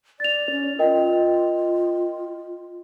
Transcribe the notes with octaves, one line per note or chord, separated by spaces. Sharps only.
D5 A6 F7
C#4
F4 A#4 D#5 G5